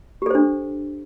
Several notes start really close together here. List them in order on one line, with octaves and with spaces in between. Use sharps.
G4 A4 C5 D4